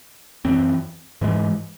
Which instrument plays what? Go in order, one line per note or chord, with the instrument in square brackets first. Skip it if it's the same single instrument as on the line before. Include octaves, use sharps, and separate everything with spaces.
[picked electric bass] F#2 E3 C4
G#2 E3 G#3